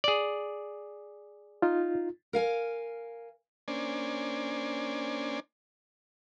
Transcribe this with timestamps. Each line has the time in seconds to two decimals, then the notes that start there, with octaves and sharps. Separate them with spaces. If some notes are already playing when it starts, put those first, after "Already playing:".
0.04 G#4 D5
1.62 D#4 F4
2.33 A#4 F5 G#5
3.68 A#3 C#4 D4 C5 D5 G#5